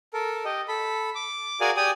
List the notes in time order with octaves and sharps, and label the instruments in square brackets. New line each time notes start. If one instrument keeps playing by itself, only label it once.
[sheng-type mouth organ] A4 A#4
G4 D#5
A4 B5
D6
F#4 G#4 A#4 D5 F5 G#5
G4 D5 G#5 D#6